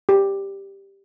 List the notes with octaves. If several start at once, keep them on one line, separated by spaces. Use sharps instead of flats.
G4